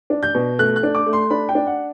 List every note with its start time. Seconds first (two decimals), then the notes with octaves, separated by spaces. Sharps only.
0.10 D4
0.23 G6
0.35 B2
0.59 A3 F#6
0.76 F#6
0.83 D4
0.95 D6
1.06 A3
1.13 C6
1.30 D4 B5
1.49 G5
1.55 D4
1.67 F#5